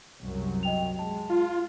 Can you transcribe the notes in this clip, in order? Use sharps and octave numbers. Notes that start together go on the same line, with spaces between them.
C2 F#2 F#3
D#5 G5 F7
G#3 A5
F4